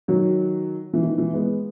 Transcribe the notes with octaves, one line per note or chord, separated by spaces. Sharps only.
D#3 F#3
E3
D#3
E3
G#3 B3